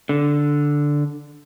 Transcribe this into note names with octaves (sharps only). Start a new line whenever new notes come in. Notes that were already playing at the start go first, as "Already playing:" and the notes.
D3